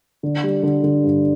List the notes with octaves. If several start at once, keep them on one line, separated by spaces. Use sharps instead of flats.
D3
G3
D3
D3
G2